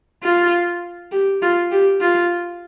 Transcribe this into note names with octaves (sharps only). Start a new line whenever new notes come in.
F4
G4
F4
G4
F4